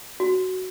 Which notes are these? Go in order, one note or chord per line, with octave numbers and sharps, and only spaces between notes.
F#4